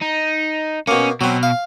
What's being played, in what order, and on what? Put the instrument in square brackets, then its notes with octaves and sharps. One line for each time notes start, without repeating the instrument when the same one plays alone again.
[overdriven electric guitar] D#4
[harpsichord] B2 A#3 [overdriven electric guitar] C#4
[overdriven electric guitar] B2 [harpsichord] F#3 C4
[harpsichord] F5